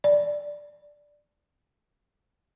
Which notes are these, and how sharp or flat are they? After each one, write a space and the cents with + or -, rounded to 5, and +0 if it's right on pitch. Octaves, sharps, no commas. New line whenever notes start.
D5 +0